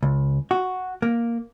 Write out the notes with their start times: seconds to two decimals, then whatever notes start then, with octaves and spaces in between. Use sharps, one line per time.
0.03 C#2
0.51 F#4
1.02 A#3